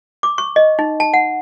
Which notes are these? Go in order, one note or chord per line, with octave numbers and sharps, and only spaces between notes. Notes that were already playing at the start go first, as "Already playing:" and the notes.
D6
C#6
D#5
D#4
A5
F#5